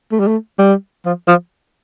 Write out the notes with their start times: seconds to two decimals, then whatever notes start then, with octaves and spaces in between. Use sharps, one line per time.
0.12 A3
0.20 G3
0.27 A3
0.59 G3
1.05 F3
1.28 F3